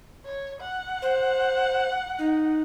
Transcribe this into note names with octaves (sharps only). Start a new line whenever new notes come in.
C#5
F#5
C5
D#4